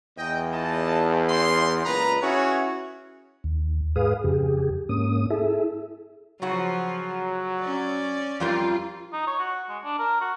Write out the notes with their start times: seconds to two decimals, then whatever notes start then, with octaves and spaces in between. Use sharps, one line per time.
0.17 E2 D#5 G5
0.51 F4 D#5 A5
1.28 C#4 C6
1.85 C#2 A#2 B4 D#5 A#5
2.21 C#4 E4 F#4 G#4 B4 C#5
3.44 D#2
3.96 G#2 G#4 B4 F5 D#6
4.24 F2 C#3 G4 G#4
4.89 G#2 A#3 C#4 D#6
5.30 E4 G#4 A4 E5
6.42 C#3 F3 F#3 F4 F#4
7.60 C#4 D5
8.40 F2 G3 F4 A#4
9.13 D#4
9.27 C#5
9.39 F#4
9.69 G#3
9.84 D4
9.99 A#4
10.21 F#4